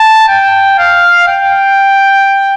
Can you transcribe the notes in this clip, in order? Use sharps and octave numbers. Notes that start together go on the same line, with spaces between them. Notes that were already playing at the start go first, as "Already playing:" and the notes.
Already playing: A5
G5
F5
G5